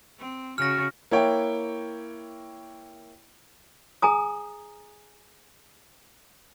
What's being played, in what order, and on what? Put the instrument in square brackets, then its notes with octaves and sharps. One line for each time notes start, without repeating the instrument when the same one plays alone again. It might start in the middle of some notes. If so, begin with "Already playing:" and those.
[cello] C4
[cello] C#3 F#4 [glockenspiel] F6 A#6
[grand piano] A#3 E4 C#5 G5
[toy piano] G#4 G#5 A#5 D#6